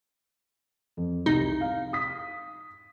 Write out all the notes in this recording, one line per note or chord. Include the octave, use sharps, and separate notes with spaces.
F2
C2 D#4
F5
D#6 B6